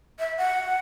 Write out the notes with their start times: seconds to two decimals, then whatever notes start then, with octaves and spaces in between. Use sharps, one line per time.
0.19 E5
0.38 F#5